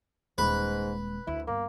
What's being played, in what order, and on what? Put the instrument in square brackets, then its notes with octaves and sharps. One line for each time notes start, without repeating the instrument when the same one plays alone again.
[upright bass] D#1 G#3 [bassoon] G#2 [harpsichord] B4
[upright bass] D2 [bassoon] E4
[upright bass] G1 [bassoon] A#3